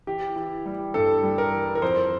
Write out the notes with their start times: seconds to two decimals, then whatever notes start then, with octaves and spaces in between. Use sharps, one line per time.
0.07 E3 G4
0.36 E3
0.66 G3
0.94 G2 A4
1.23 G3
1.38 A#4
1.53 E3
1.75 A#4
1.82 F2 C5